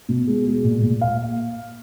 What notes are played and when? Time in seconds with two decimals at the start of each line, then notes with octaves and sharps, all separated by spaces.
0.09 B2
0.27 G#3
0.46 G#3
0.64 A#2
0.82 A#2
1.01 F5